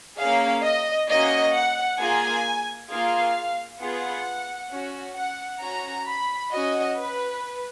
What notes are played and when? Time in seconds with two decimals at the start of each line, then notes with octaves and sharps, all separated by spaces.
0.18 A#3 C#4 G#4 F5
0.63 D#5
1.09 A#3 C#4 F#4 D#5
1.54 F#5
2.00 A#3 F4 G#4 G#5
2.90 A#3 F4 G#4 F5
3.81 B3 F4 G#4 F#5
4.71 C#4 F#4
5.16 F#5
5.62 C#4 F#4 A#5
6.07 B5
6.52 C#4 F#4 D#5
6.98 B4